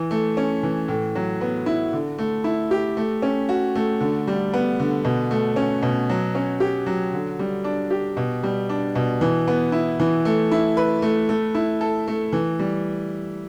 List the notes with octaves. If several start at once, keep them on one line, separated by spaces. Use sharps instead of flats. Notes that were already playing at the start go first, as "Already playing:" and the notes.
Already playing: E3
A3
C#4
E3
A2
F#3
B3
E4
D3
A3
E4
G4
A3
C#4
F#4
A3
D3
G3
B3
D3
B2
A3
C#4
B2
F#3
C#4
G4
F#3
D3
G3
D4
G4
B2
G3
D4
B2
E3
B3
E4
E3
A3
E4
B4
A3
A3
E4
A4
A3
E3
G3